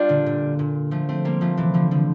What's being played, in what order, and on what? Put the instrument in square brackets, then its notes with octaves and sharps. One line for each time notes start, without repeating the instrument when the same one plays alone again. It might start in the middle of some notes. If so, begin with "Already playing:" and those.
Already playing: [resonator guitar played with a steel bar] G3 D4 F4
[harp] A#2 D3
A#2
A#2
F3 A3
A3 C4
G3 A#3
F3 A3
C3 E3
D3 F3
D3 F3